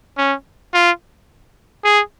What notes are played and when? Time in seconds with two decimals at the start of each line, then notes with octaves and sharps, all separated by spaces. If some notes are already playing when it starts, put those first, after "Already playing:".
0.18 C#4
0.74 F4
1.84 G#4